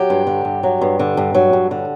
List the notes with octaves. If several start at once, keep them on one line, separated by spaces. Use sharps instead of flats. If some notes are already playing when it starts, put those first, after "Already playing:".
Already playing: F#3 G4
G2
D3
G2
F#3
G2
D3
G2
F#3
G2
D3